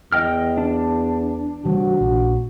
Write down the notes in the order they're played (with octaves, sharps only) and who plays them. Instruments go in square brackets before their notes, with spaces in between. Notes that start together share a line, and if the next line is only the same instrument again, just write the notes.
[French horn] E2 [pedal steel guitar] D#5 G5 F6
[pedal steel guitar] D4
[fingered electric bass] E3 G3 [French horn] F#4
[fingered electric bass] A#1